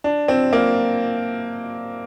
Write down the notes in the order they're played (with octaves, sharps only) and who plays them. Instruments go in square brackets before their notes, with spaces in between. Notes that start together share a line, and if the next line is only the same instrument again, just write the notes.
[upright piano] D4
C4
A#3